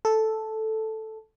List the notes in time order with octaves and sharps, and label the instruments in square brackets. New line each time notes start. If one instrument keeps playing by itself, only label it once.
[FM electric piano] A4